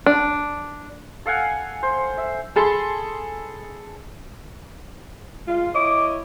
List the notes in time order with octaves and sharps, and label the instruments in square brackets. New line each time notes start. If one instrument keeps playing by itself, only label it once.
[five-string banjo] D4
[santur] A4 F5 F#5 G#5
C5
E5
[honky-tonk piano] G#4 A4 B5 C6
[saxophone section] G#3 F4
[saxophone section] E4 C#5 D#5 [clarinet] D6